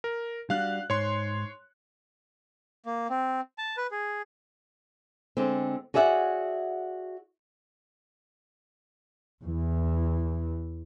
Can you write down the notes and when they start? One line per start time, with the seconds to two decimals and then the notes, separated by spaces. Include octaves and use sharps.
0.04 A#4
0.50 G3 D4 F#4 F5 F#6
0.90 G#2 C#5 C6
2.86 A#3
3.10 C4
3.58 A5
3.77 B4
3.91 G#4
5.37 D3 G#3 C4
5.94 F#4 G#4 D5 E5 F#5
9.44 E2 E3